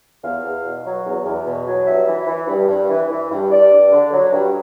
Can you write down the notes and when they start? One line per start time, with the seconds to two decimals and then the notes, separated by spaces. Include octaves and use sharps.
0.23 E2 F5
0.44 E2
0.65 B2
0.85 F#3
1.06 E2
1.26 E2
1.45 B2
1.67 F#3
1.86 G2 E5
2.08 E3
2.27 E3
2.48 G2
2.68 G2
2.89 E3
3.10 E3
3.31 G2
3.50 G2 D5
3.70 G2
3.92 D3
4.12 F#3
4.32 G2